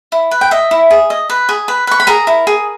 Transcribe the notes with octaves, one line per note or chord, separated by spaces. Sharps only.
E4
B4
G5
D#5 E5
E4
G#4
D#5
B4
G#4
B4
B4 C#6
B5
G#4 A#4 A#5
E4
G#4